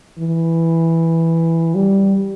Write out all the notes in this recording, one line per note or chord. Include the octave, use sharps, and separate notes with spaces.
E3
G3